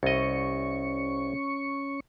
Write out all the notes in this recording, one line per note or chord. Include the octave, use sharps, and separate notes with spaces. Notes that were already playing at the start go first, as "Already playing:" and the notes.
C2 C#4 D#5 C#6